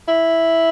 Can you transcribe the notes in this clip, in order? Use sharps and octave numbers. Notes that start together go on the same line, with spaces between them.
E4